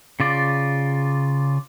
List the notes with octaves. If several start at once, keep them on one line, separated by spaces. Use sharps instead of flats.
C#3 F4 D5